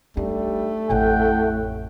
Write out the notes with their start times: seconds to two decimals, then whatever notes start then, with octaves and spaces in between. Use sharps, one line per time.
0.17 G3 A3 D4 D#4
0.90 A1 F2 A2 F#5 G5